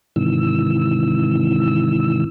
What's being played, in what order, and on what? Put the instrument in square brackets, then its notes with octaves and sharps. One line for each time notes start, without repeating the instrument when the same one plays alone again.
[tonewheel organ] G#2 C3 D#3 E3 E6